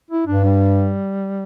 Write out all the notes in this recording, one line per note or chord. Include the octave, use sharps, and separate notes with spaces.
E4
G2 D4
G3